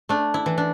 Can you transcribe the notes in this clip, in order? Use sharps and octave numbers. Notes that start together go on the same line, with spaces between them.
A3 D4
E4
E3
D4